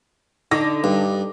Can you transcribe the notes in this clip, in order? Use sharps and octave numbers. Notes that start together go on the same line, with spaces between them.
D3 D#4 D6 A#6
G2